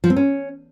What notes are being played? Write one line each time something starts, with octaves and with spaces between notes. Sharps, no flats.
F3
C4
C#4